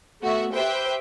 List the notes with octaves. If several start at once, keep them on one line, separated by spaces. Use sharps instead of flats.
A3 B3 F#4 E5
G4 B4 C5 E5 G5